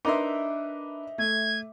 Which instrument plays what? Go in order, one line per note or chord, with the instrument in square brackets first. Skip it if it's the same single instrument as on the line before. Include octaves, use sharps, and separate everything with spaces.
[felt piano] D4 A#4 B4 [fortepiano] D#4 A#5 C6 [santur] E5 D6
[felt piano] A3 [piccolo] G#6